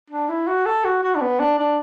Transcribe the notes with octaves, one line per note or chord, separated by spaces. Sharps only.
D4
E4
F#4
A4
F#4
F#4
D4
B3
D4
D4